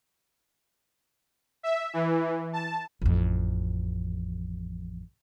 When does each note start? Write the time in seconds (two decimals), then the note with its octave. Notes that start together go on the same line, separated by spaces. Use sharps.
1.63 E5
1.94 E3
2.53 A5
3.02 A1 F2